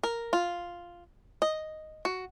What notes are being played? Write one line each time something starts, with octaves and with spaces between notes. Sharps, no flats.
A#4
F4
D#5
F#4